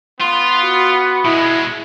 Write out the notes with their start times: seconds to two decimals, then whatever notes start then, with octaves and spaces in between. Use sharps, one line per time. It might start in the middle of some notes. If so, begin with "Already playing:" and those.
0.21 B3 F4 C6
0.62 F#4
1.25 B2 G#3 E4